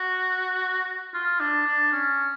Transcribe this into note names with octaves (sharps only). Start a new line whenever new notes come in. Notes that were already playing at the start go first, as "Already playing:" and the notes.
Already playing: F#4
F4
D4
D4
C#4